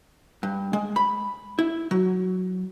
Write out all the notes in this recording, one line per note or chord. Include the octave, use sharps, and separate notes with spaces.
G2
G#3
B5
E4
F#3